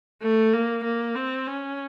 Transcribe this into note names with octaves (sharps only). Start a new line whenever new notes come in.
A3
A#3
A#3
C4
C#4